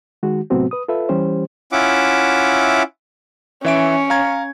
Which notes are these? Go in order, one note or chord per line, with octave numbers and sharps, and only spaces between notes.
D#3 G#3 F#4
A2 C3 F#3 B3 C4 F#4
B4 D#6
F4 A4 B4 E5
E3 G3 C#4 G4 C5
C#4 E4 F4 E5 F#5 D6
E3 C#4 E5 D7
F5 A#5 G#6